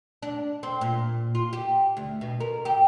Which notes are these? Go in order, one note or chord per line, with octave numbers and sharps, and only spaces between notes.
D4
C4
A#2
F4
G4
D2
B2
A#4
G4